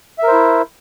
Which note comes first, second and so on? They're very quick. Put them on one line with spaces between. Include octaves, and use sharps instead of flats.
E5 A#4 C5 E4